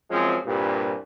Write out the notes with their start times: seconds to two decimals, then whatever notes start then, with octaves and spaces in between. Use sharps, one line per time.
0.11 F#2 F3 G#3 C4 C#4
0.46 C2 G2 A#2